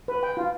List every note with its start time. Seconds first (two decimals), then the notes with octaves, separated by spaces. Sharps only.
0.08 B4
0.23 G5
0.37 F4